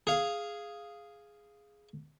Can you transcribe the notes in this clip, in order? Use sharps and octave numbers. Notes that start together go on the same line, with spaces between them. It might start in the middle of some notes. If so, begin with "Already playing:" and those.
G#4 F5